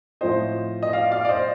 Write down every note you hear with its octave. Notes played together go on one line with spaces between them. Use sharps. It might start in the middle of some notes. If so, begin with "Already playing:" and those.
A2 F3 C4 C5 D#5
D#5
D5 F5
D5 F5
D5
C5 D#5